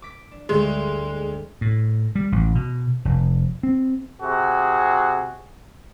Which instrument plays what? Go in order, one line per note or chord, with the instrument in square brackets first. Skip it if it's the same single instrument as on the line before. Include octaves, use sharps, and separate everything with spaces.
[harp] D6 B6
D4
[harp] D2 G2 [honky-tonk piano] G#3
[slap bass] A2
G3
A1
B2
F1
C4
[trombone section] C3 F#4 G#4